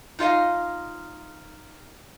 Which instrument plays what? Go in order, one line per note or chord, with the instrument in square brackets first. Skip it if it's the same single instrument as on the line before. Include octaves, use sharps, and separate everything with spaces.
[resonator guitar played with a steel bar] D#4 F4 D#5 F5